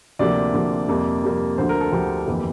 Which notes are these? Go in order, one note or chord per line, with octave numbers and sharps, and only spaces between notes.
D2 C3 F3 A#3 D5
D2 C3 F3 A#3
F2 C3 G3 A#3
F2 C3 G3 A#3
D2 D3 F3 C5
A#4
A4
D2 D3 F3 G4
G1 F2 E3 A#3